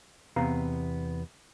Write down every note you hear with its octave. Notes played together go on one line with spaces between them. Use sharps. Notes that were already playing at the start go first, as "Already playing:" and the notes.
E2 C3 B3 F5 A#5